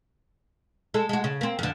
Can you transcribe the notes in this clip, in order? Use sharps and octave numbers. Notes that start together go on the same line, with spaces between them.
G#3 A4
G#3 F#4
C#3
A#3 C4
F2 D3